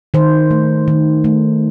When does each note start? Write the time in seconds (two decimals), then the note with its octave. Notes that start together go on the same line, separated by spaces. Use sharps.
0.14 D#3 C5
0.51 A3
0.88 D#3
1.24 A3